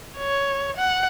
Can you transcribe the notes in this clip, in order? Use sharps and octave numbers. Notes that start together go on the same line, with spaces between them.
C#5
F#5